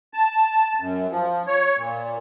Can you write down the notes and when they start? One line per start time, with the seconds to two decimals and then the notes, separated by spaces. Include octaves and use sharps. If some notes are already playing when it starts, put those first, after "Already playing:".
0.14 A5
0.80 F#2
1.11 F3
1.47 C#5
1.77 A#2